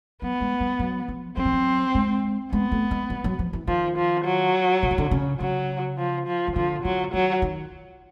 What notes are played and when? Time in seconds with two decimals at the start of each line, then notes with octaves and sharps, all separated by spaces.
0.22 F#3 B3
0.41 G#3
0.60 G3
0.79 F#3
1.08 F3
1.37 F#3 C4
1.45 F3
1.52 F#3
1.95 G#3
2.53 G#3 B3
2.72 A3
2.91 G#3
3.10 G3
3.24 F#3
3.39 F3
3.53 E3
3.67 D#3 F3
3.97 F3
4.25 F#3
4.83 D3
4.91 D#3
4.98 D3
5.11 C#3
5.40 C#3 F#3
5.98 F3
6.27 F3
6.48 D#3
6.56 D3 F3
6.84 D3 F#3
7.13 D#3 F#3
7.42 D#3